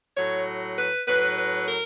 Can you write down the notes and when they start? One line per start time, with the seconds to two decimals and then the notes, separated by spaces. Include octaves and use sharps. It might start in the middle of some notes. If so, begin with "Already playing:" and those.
0.16 A2 F#3 C#5
0.77 B4
1.07 A2 F#3 B4
1.37 B4
1.68 A#4